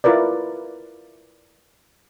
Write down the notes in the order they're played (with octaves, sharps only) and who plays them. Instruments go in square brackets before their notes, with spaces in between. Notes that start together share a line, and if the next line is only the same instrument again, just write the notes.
[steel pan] E4 F4 A#4 B4 D5